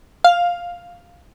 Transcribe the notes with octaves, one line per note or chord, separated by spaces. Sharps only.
F5